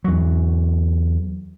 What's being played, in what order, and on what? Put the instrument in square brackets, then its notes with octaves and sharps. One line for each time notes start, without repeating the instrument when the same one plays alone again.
[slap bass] E2 F#3